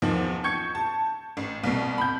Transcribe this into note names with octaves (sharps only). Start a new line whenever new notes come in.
E2 D#3 F3
C#6 G6 G#6 C#7
A5
A1
C2 B2
B5 G6